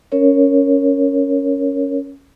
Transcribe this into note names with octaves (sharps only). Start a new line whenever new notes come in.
C#4 A#4 C#5